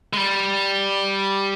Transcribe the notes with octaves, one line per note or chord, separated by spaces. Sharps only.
G#3
G3